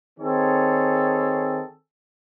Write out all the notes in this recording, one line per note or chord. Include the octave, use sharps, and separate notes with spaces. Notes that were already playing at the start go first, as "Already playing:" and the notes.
D#3 C4 G#4 A4 C#5